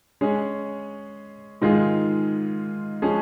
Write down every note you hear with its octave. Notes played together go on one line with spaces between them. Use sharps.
G#3 C#4 G#4 C#5
G#2 D#3 G#3 F4 G#4
F3 G#3 C#4 G#4